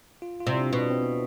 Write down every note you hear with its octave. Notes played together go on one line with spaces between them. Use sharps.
F4
F4
C3
E4
D4
B2
D4
C4
B3